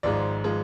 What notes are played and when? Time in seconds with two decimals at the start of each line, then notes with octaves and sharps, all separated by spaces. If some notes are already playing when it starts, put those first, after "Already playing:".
0.03 G#1 G#2 F3 G#3 D5
0.44 F3 G#3